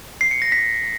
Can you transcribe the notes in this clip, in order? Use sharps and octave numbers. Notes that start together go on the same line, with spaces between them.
C7
C#7
A#6
B6